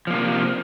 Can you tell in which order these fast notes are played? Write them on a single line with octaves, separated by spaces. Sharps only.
F3 A#3 C3